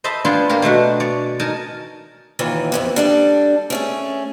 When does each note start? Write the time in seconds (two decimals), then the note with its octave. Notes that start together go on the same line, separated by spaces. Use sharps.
0.04 C5 D#5 E5 A5 B5
0.25 B3 D4 F4 G#4 D5 G5
0.49 A#3 G4 A#4
0.62 B2 A3 D4 F#4
1.00 C#5 D5 G#5
1.39 D#4 A#4 G#5 A5
2.39 D#2 A#2 D#3 E3
2.72 F2 C3 B3
2.96 G3 D4 A4
3.70 A3 C#4 G#4